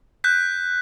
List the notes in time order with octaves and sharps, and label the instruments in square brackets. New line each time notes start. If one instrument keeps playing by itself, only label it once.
[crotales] F#6 G6 B6